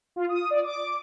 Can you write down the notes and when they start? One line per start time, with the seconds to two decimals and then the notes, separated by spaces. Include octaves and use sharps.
0.16 F4
0.29 D#6
0.50 D5
0.64 D6